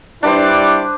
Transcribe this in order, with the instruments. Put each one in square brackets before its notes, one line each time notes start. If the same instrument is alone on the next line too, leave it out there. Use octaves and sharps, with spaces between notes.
[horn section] G3 E4 D5 [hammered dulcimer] D4 B4 C5